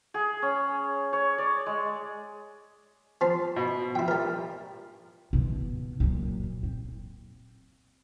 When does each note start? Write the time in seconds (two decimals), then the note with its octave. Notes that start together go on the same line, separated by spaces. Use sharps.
0.14 G#4
0.42 C#4
1.13 C#5
1.38 D5
1.66 G#3
3.21 F3 A5 C6
3.56 B2
3.95 F3 E4 G5
4.08 G3 A#4
5.33 B2 D#3
6.00 A#2 F#3
6.63 C4